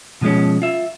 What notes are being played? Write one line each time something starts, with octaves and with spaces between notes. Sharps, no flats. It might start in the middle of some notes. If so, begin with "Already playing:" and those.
B2 F3 F#3 G#3 C#4
F4 E5